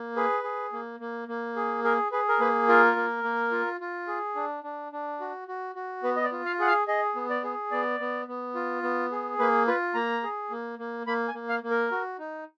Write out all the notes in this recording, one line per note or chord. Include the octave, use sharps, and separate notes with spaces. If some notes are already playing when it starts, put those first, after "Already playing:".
Already playing: A#3
G#4 B4
G#4
A#3
A#3
A#3
G#4
G#4 A#4
G#4 B4
A#4
A#3 B4
F4 A#4
A#3
A#3
F4
F4
G#4
D4
D4
D4
F#4
F#4
F#4
B3 B4
D#5
D5
F4
F5
G#4 F#5
F5
G#4 D#5
B3
D5
G#4
B3 D5
B3
B3
F4
B3
G#4
A#3 B4
F4 B4
A#3 A#5
G#4
A#3
A#3
A#3 B5
G#5
A#3
F5
A#3
A#4
F#4
D#4